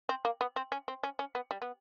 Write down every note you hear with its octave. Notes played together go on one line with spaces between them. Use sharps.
C4
A#3
B3
C4
C#4
C4
C#4
C#4
B3
G3
B3